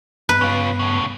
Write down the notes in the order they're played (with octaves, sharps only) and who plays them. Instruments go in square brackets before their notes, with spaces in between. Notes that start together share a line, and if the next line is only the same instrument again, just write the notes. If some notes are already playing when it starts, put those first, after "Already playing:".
[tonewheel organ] G2 B3 B5 [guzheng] B4
[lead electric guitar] C#4 F4
A2 C#3